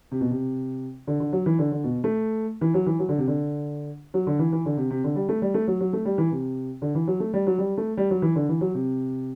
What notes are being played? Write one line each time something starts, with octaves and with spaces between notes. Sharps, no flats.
C3
B2
C3
D3
D3
F#3
E3
D3
D3
B2
A3
E3
F#3
E3
F#3
D3
C3
D3
F#3
D3
E3
E3
D3
C3
C3
D3
G3
A3
G3
A3
F#3
F#3
A3
G3
E3
C3
D3
E3
F#3
A3
G3
F#3
G3
A3
G3
F#3
E3
D3
E3
F#3
C3